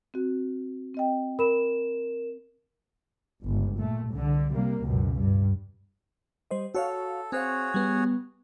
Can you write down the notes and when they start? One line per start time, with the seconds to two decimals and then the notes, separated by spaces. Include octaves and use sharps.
0.14 C4 F#4
0.95 C4 D#5 G5
1.39 A#4 B5 E7
3.44 G1 C#2
3.78 A#2 A3
4.10 C2 D3
4.52 C3 G3 A#3
4.84 C#2 F#2 B2
5.13 G2
6.51 G3 C5 D#5
6.74 F#4 A4 C#5 F5
7.32 C4 F#4 G#4 C5 C#5 F5
7.74 G3 B3